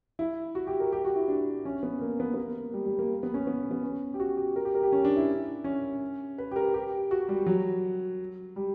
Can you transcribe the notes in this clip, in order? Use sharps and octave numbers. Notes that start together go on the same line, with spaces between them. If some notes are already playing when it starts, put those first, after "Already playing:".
E4
F#4
G4
A#4
G4
F#4
E4
D4
C#4
B3
A#3
B3
B3
A#3
G3
G3
A#3
B3
C#4
B3
B3
C#4
G4
F#4
G4
A#4
G4
A#4
G4
C#4
D4
E4
C#4
B4
G4
A#4
G4
F#4
G3
F#3
G3